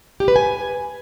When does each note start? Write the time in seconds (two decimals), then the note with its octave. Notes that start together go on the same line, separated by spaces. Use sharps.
0.20 G4
0.28 B4
0.36 G#5